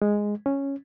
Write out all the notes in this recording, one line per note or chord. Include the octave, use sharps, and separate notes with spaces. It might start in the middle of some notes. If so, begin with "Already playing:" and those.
G#3
C#4